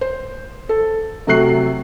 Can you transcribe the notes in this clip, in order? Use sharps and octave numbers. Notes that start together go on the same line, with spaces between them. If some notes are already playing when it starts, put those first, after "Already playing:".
C5
A4
C3 F#3 A3 F#4 F#6 C7